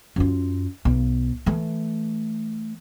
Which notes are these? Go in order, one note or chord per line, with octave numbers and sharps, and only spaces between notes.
F#2 F4
B1
E3 A3